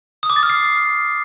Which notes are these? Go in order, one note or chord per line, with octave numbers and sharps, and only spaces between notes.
D#6
D6
A6
F6
C7